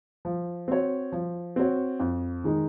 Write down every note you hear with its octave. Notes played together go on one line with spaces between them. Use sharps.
F3
C4 F#4 C#5
F3
C4 F#4 C#5
F2
D#3 G#3 D#4